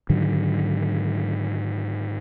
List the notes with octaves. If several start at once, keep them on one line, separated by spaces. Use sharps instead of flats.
G#2 D3 D#3 F#3